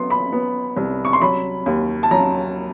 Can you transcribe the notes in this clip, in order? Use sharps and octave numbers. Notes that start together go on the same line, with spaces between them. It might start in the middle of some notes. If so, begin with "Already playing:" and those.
Already playing: F#3 B3 C6
B5
B3
C2
C#6
C6
F#3 B5
D#2
A5
F#3 A#5